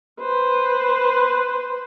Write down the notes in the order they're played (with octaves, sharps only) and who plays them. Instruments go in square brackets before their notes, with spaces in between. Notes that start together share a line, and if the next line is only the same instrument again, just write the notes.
[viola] B4 C5